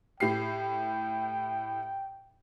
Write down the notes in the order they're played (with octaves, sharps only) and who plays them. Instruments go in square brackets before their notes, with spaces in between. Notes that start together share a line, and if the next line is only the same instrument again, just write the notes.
[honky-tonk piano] A2 G4 C7 [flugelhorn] G5